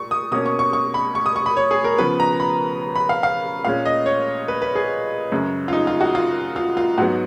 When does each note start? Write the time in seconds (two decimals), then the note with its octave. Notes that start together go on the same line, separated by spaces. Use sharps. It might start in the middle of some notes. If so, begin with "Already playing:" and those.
Already playing: A#2 C#6
0.11 D#6
0.32 B2 A#3 C#4 D#6
0.46 C#6
0.59 C#6
0.73 C#6
0.94 B5
1.15 C#6
1.26 D#6
1.36 C#6
1.46 B5
1.57 C#5
1.71 G#4
1.84 A#4
1.98 C#3 F3 B3 B4
2.20 A#5
2.40 B5
2.96 B5
3.09 F5
3.23 F5
3.65 A#2 G#3 C#4 F5
3.85 D#5
4.06 C#5
4.48 B4
4.62 B4
4.75 G#4
5.32 F#2 C#3 G#3
5.68 F4
5.73 D#4
5.87 F4
6.01 F#4
6.15 F4
6.56 F4
6.77 F4
6.98 G#2 F#3 B3 F#4